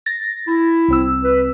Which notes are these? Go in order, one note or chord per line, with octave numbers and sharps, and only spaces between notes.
A6 A#6
E4
C2 C4 E6
B4